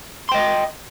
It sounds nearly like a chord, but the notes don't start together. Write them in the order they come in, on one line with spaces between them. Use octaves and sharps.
C6 G5 D#5